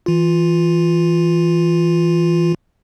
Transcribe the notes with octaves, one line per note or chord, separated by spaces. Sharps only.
E3 F4